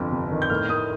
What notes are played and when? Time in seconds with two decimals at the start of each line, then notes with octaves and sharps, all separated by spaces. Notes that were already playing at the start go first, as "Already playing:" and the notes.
Already playing: G1 F2
0.12 C3
0.31 D#3
0.42 G6
0.50 A2 F6
0.69 A3 D#6